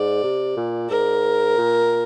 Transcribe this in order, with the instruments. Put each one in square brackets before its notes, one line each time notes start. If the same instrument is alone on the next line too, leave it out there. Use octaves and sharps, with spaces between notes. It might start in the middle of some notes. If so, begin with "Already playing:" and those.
Already playing: [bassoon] G#2 [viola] D5
[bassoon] C3
A#2
[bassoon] G#2 [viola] A#4
[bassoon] A#2